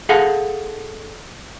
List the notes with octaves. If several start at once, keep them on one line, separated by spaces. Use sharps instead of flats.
G#4 A4 F5 F#5